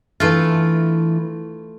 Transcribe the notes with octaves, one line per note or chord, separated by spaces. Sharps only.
E3 A3 D4 F4